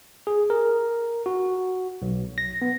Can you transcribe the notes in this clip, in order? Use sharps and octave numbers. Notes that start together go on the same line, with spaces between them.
G#4
A#4
F#4
B1
A#6
B3